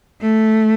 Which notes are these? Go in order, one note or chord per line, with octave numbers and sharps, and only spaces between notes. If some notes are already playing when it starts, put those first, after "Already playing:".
A3